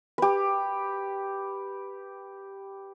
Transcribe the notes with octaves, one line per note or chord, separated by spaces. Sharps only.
G4 B4